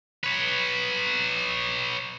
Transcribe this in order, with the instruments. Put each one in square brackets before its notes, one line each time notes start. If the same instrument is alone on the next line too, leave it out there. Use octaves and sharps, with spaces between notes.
[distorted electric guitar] B4 C#5